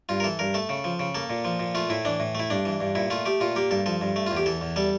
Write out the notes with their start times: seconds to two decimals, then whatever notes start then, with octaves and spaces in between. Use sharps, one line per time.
0.09 G2 F4
0.20 A#4
0.24 E3 A4
0.39 G2 A#4
0.54 A3 A4
0.69 C#3
0.84 F3
0.99 C#3
1.15 A#3 A4
1.30 A#2
1.45 F3
1.59 A#2
1.75 A3 F4
1.90 A2 E4
2.05 E3 D4
2.20 A2
2.35 A3 E4
2.50 G2 D4
2.65 E3
2.80 G2
2.95 A#2 E4
3.10 A3 F4
3.26 A3 G4
3.40 A#2 F4
3.56 A#3 G4
3.71 G2 A4
3.86 F3 A4
4.01 G2
4.16 A3
4.26 E2 F4
4.37 G4
4.46 E3 A4
4.61 E2
4.76 G3 A4